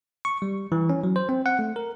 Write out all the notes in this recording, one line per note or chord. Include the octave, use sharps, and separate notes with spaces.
C#6
G3
E3
C#4
F#3
C5
C4
F#5
A3
A#4